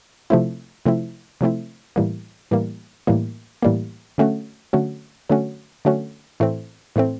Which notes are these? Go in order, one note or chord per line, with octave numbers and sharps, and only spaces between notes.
C3 F3 A3 C4 E4
C3 F3 A3 C4 E4
C3 F3 A3 C4 E4
A2 E3 G3 A#3
A2 E3 G3 A#3
A2 E3 G3 A#3
A2 E3 G3 A#3
D3 F#3 A3 C#4 F#4
D3 F#3 A3 C#4 F#4
D3 F#3 A3 C#4 F#4
D3 F#3 A3 C#4 F#4
A2 E3 A3 C4
A2 E3 A3 C4